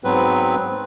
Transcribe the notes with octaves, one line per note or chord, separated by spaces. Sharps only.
G#2 F#3 B3 C4 B4